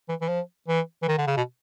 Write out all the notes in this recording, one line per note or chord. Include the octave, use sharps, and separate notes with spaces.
E3
E3
F3
E3
E3
D#3
D3
C#3
B2